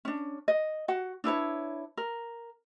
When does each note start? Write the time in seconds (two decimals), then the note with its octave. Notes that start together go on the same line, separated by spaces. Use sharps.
0.05 C#4 D4
0.48 D#5
0.88 F#4 F#5
1.24 D4 E4 B4 C#5
1.97 A#4